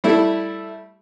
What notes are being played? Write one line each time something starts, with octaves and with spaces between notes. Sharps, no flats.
G3 A3 E4